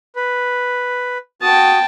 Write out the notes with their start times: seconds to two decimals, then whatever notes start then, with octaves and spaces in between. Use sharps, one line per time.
0.16 B4
1.42 F#4 G5 A5 D#6